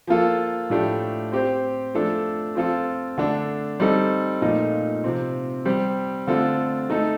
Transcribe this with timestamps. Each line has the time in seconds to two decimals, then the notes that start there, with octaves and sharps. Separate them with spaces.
0.07 F3 A#3 F4 A4
0.70 A2 F3 A3 D4 G4
1.32 C4 G4 C5
1.94 F3 A3 D4 A4
2.55 F3 C4 F4 A4
3.18 D3 A3 D4
3.80 G3 C4 D#4 A4
4.41 A#2 F3 A3 D#4
5.04 C3 F3 C4
5.65 G3 C4 G4 C5
6.27 D3 A3 C4 F4 A4
6.90 A3 D#4 A4